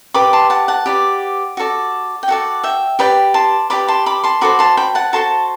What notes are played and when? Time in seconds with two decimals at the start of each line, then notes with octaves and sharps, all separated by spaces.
0.14 G4 B4 D5 B5 D6
0.33 A5 C6
0.50 F#5 A5
0.68 F#5 A5
0.86 G4 B4 D5
1.57 F#4 A4 D5
2.23 G5
2.28 F#4 A4 D5 F#5
2.64 E5 G5
2.99 G4 B4 D5 G5 B5
3.34 A5 C6
3.70 G4 B4 D5 B5 D6
3.88 A5 C6
4.06 B5 D6
4.24 A5 C6
4.41 F#4 A4 C5 B5 D6
4.59 A5 C6
4.77 G5 B5
4.95 F#5 A5
5.13 F#4 A4 C5 A5 C6